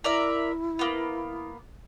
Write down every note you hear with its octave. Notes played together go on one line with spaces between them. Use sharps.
E4 A#4 D5 E5
A#3 B3